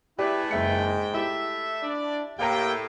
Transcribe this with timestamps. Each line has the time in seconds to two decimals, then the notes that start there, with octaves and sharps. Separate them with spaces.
0.19 A3 E4 G4 G#4 B4 D5
0.51 F#1 G#2 G#3 E5 G5 C#7
1.14 A3 E4 G4 E5
1.82 D4 D5
2.39 A2 A#3 G4 F5 G5 A#5